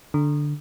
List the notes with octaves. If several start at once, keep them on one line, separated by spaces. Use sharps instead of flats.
D3